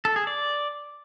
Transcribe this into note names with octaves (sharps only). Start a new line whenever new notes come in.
A4
G#4
D5